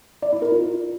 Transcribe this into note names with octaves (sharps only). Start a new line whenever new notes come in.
D5
E4
A#4
F4